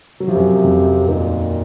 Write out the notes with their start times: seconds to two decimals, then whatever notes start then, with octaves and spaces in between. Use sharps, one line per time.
0.20 C3 F#3
0.28 F3
0.36 F#2 F#3
0.64 F2 F3
1.08 D#2 A#2 D#3